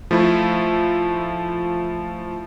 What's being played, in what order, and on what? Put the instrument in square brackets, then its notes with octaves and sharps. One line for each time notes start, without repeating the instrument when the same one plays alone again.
[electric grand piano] F3 A3 E4